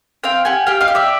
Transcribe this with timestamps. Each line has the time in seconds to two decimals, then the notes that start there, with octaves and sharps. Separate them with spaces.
0.24 C4 F5 G5
0.45 G4 F#5 G#5
0.66 G4 F5 G5
0.81 D#5 F5
0.88 G4
0.95 D5 E5